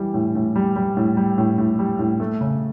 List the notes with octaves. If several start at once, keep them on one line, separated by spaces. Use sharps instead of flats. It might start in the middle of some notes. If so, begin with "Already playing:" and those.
Already playing: E3 G3
A2
A2
G3
G3
A2
G3
A2
A2
G3
A2
A3
C#3